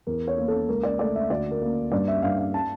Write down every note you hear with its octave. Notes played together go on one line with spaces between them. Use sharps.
E2 A#4
C#5
A#3
A4
C#2 A#4
D5
A3 D5
E5
D2 D5
A#4
A#3
G2 D5
E5
G2 F5
F5
A5